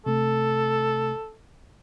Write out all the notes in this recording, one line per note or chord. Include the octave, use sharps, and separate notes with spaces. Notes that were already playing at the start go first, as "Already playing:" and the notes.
C3 A3 A4